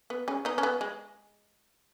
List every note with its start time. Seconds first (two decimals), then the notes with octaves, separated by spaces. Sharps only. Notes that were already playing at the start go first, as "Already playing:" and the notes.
0.10 B3
0.28 G#3 C#4
0.45 B3 D#4
0.58 C#4
0.63 B3
0.81 G#3